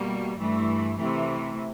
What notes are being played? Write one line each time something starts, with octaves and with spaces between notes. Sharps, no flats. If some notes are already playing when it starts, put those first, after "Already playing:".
Already playing: B2 G3 A#3
G2 E3 A3
C3 E3 A3